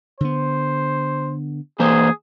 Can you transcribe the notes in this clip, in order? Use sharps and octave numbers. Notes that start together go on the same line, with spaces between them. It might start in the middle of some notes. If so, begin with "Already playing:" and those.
D3 B3 C5
E3 A#3 G#4 C5